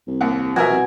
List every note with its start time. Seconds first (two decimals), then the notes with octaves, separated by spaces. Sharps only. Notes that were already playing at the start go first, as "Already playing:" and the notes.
0.07 C2
0.21 D#2 A#3 F#5
0.56 B2 F3 F#4 A#4 E5 G#5
0.70 C2